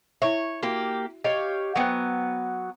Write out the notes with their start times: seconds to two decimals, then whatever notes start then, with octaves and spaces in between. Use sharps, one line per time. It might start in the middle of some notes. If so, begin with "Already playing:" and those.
0.22 E4 C#5 E5
0.63 A#3 F#4 G4
1.24 G4 C#5 D#5 F5
1.76 F#3 B3 C5 G5 G#5